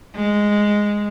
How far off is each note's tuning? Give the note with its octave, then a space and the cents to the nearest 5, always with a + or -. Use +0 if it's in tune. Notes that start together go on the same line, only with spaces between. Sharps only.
G#3 -5